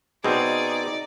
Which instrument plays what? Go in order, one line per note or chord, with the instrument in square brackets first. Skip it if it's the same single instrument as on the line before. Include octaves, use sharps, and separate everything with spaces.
[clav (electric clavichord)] B2 C4 [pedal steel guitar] D#4 [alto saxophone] G#4 [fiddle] D5